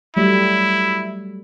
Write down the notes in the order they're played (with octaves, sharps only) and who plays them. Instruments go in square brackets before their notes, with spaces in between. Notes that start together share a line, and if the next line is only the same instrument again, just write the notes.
[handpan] F#3 G3 A3 [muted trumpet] E4